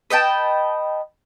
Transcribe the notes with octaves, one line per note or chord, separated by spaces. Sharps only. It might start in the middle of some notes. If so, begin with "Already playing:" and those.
B4 D#5 G5 A5